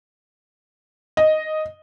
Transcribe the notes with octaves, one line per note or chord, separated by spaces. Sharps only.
D#5